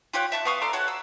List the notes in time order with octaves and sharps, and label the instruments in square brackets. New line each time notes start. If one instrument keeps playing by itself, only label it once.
[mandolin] F4 G4 C#5 F#5
E5 A5 C#6
B3 F5 C#6 D#6
A4 D5 A#5 C6
F#4 A4 C#5 F#5
E6